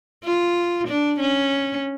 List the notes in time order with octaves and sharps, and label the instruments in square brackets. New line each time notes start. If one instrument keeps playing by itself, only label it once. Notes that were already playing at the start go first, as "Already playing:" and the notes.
[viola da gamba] F4
D4
C#4